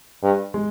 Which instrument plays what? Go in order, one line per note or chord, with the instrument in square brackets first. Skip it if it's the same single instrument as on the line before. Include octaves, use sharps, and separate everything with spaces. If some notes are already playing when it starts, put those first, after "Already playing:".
[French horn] G2
[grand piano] G#3